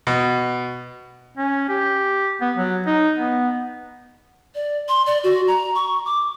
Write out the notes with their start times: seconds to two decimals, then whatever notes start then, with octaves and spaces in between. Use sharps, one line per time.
0.07 B2
1.37 C#4
1.69 G4
2.41 B3
2.56 F#3
2.86 D#4
3.15 B3
4.55 D5
4.89 C6
5.06 D5
5.24 F#4
5.47 A#5
5.75 C#6
6.05 D6